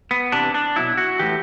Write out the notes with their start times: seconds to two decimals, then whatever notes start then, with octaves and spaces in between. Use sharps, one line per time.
0.11 B3
0.32 C3 E3 D4
0.54 D4
0.76 B2 F#3 E4
0.97 F#4
1.19 A2 E3 G4